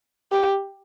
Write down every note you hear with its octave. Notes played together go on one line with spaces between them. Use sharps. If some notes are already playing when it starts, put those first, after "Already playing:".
G4